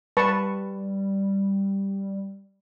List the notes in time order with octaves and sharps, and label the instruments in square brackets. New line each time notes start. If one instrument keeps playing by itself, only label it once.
[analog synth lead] G3 [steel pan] B4 A5 C#6